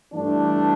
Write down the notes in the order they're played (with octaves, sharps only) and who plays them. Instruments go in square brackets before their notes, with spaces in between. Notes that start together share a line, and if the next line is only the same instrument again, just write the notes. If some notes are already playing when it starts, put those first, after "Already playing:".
[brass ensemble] G2 E3 A3 D4